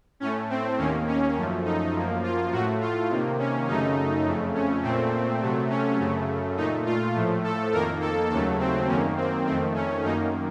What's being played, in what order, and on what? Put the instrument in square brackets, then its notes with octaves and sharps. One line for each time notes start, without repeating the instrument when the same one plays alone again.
[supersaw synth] A2 A3 C#4
C4
D#2 D#3 A#3 C#4
C#4
F#2 F3 A3
D#4
F#2 F3 A#3
F4
A2 F#4
A3
F4
C3 D#3 A#3
C#4
F#2 C#3 A3 D#4
F2 C#3 A3
C#4
A#2 A3 C4
C3 F#3 A3
C#4
F#2 C#3 A3
A#2 A3 D#4
F4
A2 F3 A3
A4
F2 D#3 A#3 A#4
A4
D#2 C#3 F#3 A3 A4
C4
F#2 D#3 A#3 C#4
C4
F2 D#3 A3 C4
C#4
F#2 D#3 A#3 D#4